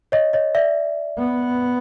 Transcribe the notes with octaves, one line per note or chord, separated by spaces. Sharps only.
C#5 D#5
C#5 D#5
D5 E5
B3